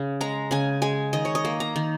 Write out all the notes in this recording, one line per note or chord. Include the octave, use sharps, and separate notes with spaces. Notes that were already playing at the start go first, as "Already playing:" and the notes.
Already playing: C#3
G#3 A#5
C#3 G#5
G#3 G#5
D#3 D#5
C#5
D#5
A#3
A#5
D#3